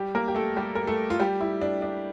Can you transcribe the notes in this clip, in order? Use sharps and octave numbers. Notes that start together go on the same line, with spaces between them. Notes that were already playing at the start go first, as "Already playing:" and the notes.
Already playing: G3 G4
A#3 A#4
G4
A3 A4
G3 G4
A#4
A3 A4
F4
G3 G4
E4
D4
D4